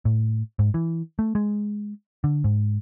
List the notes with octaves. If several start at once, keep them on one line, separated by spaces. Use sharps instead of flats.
A2
G#2
E3
A3
G#3
D3
G#2